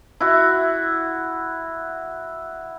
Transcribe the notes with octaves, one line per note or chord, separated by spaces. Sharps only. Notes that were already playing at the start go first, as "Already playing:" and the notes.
E4 F#4 E5